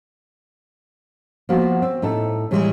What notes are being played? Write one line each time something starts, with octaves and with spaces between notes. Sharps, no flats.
F3 A#3 B3 F#4
C4
A2 D#4 A4
A2 E3 G3 G#3